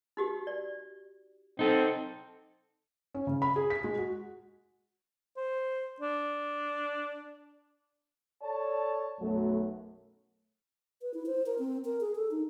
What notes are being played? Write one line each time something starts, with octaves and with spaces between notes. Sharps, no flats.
D#4 F#4 G4
D5
C4 D#4 A4
C#4
C#3
B5
G#4
B6
G#3
F#4
C5
D4
A4 C#5 D5 A5
B1 F#2 F#3 A3
B4
E4
C5
A#4
C4
A#4
G#4
A4
D#4